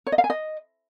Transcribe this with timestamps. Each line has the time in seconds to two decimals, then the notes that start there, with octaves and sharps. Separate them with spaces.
0.07 C#5
0.12 D#5
0.18 F5
0.24 G#5
0.30 D#5